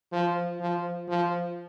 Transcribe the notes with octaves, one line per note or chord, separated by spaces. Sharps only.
F3
F3
F3